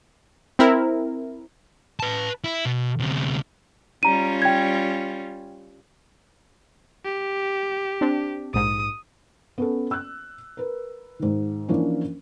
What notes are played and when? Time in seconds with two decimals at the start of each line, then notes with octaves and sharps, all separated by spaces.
0.59 C4 E4 A#4
2.00 B4 A5
2.44 E4
2.65 B2
3.00 D2 C3
4.03 G3 C#4 F4 A#5 D#7
4.42 G5 G#6
7.05 G4
8.01 C4 D4
8.54 A#1 G#2 D#6
9.58 B3 C#4 A4
9.91 E6 F#6
10.57 A#4 B4
11.19 G#2 D#3
11.68 E3 F3 A#3 C#4 D4